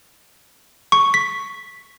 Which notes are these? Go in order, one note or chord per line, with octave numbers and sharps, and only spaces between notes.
C#6
B6